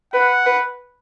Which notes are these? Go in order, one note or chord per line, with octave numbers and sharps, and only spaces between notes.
B4 F#5
B4